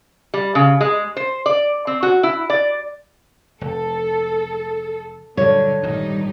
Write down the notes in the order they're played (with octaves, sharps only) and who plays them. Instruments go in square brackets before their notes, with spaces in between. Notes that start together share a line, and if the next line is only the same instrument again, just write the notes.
[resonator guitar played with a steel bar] G3
C#3
G#3
C5
D5
C4
F#4
E4
D5
[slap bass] F1 [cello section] A4
[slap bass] G2 A#2 F#3 [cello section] D3 [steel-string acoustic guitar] C#5
[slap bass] G#1 A#2 [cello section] G2 G3 D#4